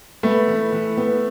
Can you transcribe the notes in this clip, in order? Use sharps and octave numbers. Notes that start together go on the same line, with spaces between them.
A3 B3
E3
E3
B3